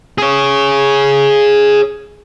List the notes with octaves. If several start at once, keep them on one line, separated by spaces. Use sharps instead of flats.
G#4 C#5